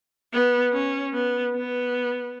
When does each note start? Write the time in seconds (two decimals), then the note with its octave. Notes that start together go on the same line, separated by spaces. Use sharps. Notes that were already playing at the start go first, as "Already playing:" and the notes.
0.33 B3
0.73 C#4
1.14 B3
1.54 B3